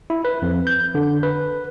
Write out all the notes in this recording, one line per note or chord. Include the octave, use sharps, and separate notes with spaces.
E4
B4
F2
G6
D3
B4